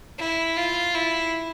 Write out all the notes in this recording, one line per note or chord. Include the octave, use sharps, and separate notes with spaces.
E4
F4
E4